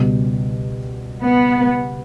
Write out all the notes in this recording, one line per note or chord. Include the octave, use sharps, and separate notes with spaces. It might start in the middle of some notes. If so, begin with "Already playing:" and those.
Already playing: C#2 B2 G3
B3